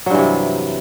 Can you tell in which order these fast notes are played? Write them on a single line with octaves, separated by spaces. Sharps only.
F#3 G2 E3 C3